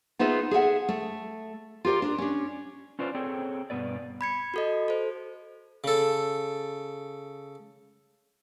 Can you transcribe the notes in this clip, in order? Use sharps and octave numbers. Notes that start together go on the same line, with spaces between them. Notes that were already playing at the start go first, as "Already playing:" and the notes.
B3 D#4 F4 G#4 E5
G#4 A4 E5 F#5
A3
F4 G4 A#4 D5
D4 A#4
C#4 D4
C#4 F4 B4 C5 D5
C4 G#4 A4 C#5 G5
G2 B2 B3 B4 D5
B5 G#6 C#7
F#4 A4 D#5
A4 C5
C#3 A4